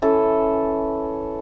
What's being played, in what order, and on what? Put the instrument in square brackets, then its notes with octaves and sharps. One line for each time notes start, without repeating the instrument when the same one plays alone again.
[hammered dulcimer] E3 C#4 A4